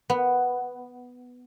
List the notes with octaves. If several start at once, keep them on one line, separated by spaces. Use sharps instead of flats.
B3